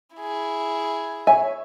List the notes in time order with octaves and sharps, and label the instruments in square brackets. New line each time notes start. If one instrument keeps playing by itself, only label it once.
[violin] E4 G#4
[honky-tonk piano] C#5 E5 [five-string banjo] G#5